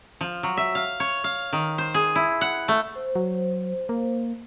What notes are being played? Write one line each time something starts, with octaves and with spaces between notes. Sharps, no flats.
F3
F#3
E5
F5
C#5
F5
D#3
C5
G#4
E4
F#5
A3
C5
F#3
A#3